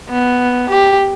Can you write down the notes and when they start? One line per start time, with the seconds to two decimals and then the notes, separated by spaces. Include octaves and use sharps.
0.10 B3
0.70 G4